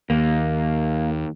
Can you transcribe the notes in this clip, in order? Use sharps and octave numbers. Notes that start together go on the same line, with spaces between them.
D#2 A#3